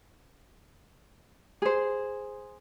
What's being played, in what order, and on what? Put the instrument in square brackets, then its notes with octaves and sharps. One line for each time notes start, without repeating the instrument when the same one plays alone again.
[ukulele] G#4 C5